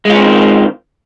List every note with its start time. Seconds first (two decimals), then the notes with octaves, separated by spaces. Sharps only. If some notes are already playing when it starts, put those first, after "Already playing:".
0.05 G#3
0.10 F4
0.14 C#4
0.19 C4
0.24 D#3